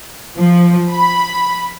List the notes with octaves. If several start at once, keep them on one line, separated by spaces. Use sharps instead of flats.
F3
B5